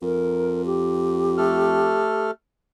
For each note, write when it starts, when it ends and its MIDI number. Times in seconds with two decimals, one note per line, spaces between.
0.02 2.02 41
0.02 0.65 70
0.65 2.30 67
1.37 2.31 57
1.37 2.31 69
1.37 2.31 89